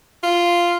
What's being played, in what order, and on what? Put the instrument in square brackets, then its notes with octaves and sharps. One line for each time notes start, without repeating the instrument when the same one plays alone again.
[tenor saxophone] F4